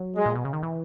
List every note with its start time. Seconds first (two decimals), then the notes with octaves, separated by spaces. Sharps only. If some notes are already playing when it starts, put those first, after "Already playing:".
Already playing: F#3
0.16 G#3
0.26 A#2
0.35 B2
0.45 C#3
0.53 D#3
0.63 E3